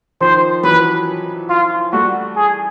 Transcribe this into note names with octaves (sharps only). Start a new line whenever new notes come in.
D#3 F3 C5
E3 F#3 B4
F4
G3 A3 F#4
G#4